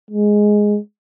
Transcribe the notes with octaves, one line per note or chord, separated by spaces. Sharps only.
G#3